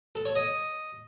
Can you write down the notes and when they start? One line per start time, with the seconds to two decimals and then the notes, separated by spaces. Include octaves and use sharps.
0.15 A4
0.25 C#5
0.36 D#5